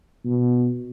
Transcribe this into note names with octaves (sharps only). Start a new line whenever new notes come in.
B2